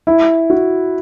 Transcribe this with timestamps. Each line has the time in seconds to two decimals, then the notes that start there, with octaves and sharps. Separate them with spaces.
0.07 E4
0.50 F#4